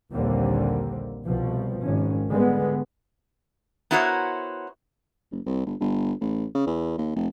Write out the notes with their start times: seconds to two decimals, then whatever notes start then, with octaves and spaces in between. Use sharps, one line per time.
0.12 A#1 D#2 D3 G3 A#3 C4
1.26 C2 B2 F3
1.82 G#1 C#4
2.30 D3 G3 G#3 B3
3.91 B3 E4 F#4 A#4 C5 C#5
5.32 F#1
5.46 C2
5.66 G1
5.80 G1
6.21 A1
6.55 C#3
6.67 E2
6.98 D#2
7.16 F1